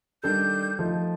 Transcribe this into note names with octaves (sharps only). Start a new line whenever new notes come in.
D#3 G3 D4 A4 G6
F3 A3 D#4